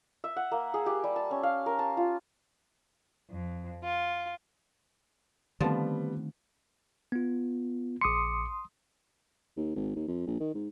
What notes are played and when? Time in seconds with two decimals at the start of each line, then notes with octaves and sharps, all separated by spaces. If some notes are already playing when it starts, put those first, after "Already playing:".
0.24 E5
0.36 F#5
0.52 A#3
0.74 G#4
0.86 G4
1.04 G3
1.16 A5
1.31 C#4
1.43 F5
1.66 A#4
1.79 A5
1.97 F4
3.30 F2
3.83 F4
5.60 D3 D#3 F3 G3 A3 B3 C4
7.12 B3 F4
8.01 A#1 C6 D6 D#6 C#7
9.57 D#2
9.75 G#1
9.96 D#2
10.08 F2
10.27 A#1
10.40 D#3
10.55 G#2